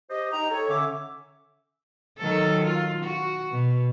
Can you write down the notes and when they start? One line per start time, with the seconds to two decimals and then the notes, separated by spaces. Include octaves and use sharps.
0.10 G4 C5 D#5
0.32 D#4 D#5 G5 A#5
0.51 A4 C#5
0.69 D3 C#4 E5 D6
2.18 D#3 F#3 A4
2.64 F4
3.04 F#4
3.52 B2